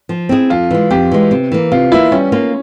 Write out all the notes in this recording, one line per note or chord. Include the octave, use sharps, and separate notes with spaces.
F3
C4 E4 G#4
F2 F4
E3 G#3
F2 G4
E3 G#3
C3
E3 A#3
C3 F4
E3 A#3 E4
G3 C#4
A#3 F4